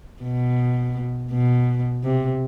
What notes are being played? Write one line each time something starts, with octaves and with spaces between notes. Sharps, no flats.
B2
B2
C3